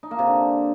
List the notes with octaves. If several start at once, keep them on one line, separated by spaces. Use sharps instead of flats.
D#4
A#3
C3
D3